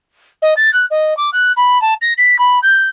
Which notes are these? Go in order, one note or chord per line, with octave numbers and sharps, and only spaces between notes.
D#5
A6
F#6
D#5
D6
F#6
B5
A5
A#6
B6
B5
G6